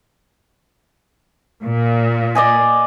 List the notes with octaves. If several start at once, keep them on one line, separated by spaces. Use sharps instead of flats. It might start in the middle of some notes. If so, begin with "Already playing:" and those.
A#2
D5 D#5 G#5